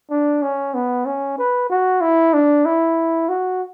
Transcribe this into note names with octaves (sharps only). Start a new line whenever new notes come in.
D4
C#4
B3
C#4
B4
F#4
E4
D4
E4
F#4